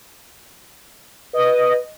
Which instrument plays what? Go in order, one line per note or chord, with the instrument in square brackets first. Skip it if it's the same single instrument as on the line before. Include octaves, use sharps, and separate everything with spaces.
[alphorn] B4 [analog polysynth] D#5